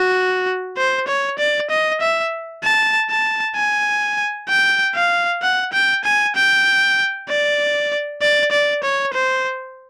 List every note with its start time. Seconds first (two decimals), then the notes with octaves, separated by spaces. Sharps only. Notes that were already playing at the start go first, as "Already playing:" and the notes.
Already playing: F#4
0.77 C5
1.08 C#5
1.39 D5
1.71 D#5
2.01 E5
2.63 A5
3.10 A5
3.56 G#5
4.49 G5
4.95 F5
5.42 F#5
5.73 G5
6.05 G#5
6.36 G5
7.29 D5
8.22 D5
8.52 D5
8.84 C#5
9.14 C5